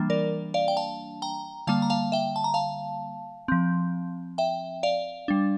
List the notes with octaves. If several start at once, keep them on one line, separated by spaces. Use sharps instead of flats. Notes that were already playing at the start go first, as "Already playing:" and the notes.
Already playing: E3 G3 A#3 D4
A#4 D5
D5 F5
G5
F5 A5
G5 A#5
D3 G3 A#3 F5 A5
A#5
F5 A5
E5 G5
A5
A#5
F5 A5
F3 C4
E5 G5
D5 F5
G3 D4